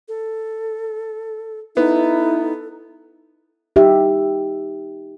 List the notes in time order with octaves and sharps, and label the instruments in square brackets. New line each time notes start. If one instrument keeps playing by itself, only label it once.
[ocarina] A4
[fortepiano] B3 [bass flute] D#4 [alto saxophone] E4 [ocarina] A4
[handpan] D#4 G4 E5